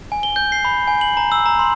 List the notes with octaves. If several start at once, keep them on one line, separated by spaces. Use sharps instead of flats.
G#5
G7
G6
C7
B5
G#5
F#7
A#5
E6
A#5
C6